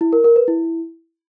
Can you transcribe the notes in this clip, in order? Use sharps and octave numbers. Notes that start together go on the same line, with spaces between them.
E4
A#4
A#4
B4
E4